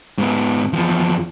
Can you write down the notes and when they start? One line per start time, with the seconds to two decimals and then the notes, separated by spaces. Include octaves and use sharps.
0.18 G#2 B3
0.73 E2 F3